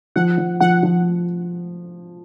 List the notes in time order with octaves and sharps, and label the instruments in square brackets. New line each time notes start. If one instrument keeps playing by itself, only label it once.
[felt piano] F3 [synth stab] F#5
[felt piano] F3
[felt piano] F3 [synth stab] F#5
[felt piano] F3